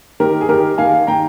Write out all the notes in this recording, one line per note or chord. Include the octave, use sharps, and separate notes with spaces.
D#3 G4 A#4
G#4
D#3 G4 A#4
D#3 F5 G#5
D#3 G5 A#5